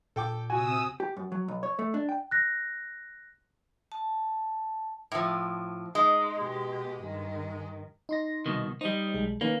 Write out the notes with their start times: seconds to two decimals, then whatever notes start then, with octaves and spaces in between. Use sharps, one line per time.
0.16 A#2 A4 G5 D6
0.50 C3 F#4 G#5 D#6 E6
1.00 G4
1.17 F#2
1.32 F#3
1.48 B1
1.63 C#5
1.79 A3
1.94 D4
2.09 G5
2.31 F#6 A#6
3.92 A5
5.12 A2 F3
5.95 G#3 D#4
6.40 B2 G4
7.03 G2 D#3
8.09 D#4 C6 A#6
8.46 C2 B2 D#3
8.81 G3 D#4 C5 D#5
9.14 B1 G#3
9.41 D#3 A#3 C#4 B4